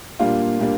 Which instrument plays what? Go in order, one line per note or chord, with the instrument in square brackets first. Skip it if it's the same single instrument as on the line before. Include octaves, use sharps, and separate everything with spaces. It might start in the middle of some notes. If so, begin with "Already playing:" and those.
[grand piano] A#2 G3 A#3 D4 F4
A#2 G3 A#3 D4